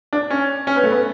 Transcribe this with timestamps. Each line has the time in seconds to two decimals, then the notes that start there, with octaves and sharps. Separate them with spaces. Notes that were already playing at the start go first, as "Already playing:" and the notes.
0.13 D4
0.30 C#4
0.67 C#4
0.76 B3
0.84 A3
0.92 B3